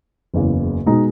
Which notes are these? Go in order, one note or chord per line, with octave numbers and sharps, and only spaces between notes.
F#1 E2 C#3
B2 G#3 D#4